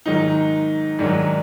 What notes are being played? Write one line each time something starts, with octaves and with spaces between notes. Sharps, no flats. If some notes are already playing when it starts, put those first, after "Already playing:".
G#2 D#3 F#3 D#4
G#2 D#3 F#3 D4